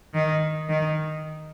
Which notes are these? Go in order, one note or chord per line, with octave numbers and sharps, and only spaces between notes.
D#3
D#3